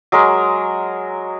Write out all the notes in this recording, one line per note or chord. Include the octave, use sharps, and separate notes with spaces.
F#3 G#3 A#4